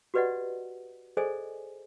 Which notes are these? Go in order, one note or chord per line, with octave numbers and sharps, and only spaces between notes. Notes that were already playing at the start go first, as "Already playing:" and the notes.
F#4 G4 B4 D5 D#5 F#5
G#4 A4 C5 D5 D#5 G#5